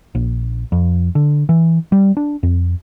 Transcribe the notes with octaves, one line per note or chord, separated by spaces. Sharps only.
A#1
F2
D3
E3
G3
D4
F2